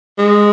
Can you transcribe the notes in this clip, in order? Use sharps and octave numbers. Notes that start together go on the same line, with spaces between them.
G#3